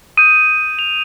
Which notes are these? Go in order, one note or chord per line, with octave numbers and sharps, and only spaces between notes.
D#6 G6 D#7
F7